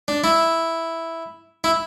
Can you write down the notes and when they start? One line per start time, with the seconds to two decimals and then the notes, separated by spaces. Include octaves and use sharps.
0.08 D4
0.24 E4
1.64 E4